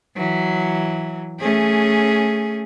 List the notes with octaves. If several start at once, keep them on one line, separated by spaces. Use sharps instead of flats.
E3 F#3
A3 C#4 G#4